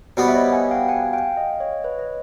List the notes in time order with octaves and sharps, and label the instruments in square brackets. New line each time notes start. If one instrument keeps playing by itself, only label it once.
[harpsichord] B2 G3 B3 [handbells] C5 D5
[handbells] E5
C#5 D#5
F#5 G#5
F5 G5
F#5 G#5
F5 G5
D#5 F5
C#5 D#5
B4 C#5
D#5